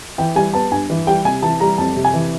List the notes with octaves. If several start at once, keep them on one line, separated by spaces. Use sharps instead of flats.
E3 G5
G3 G#5
B3 A5
G2 G#5
E3
G3 G5
C3 G#5
E3 A5
G3 A#5
F2 A5
C3
G#5
E3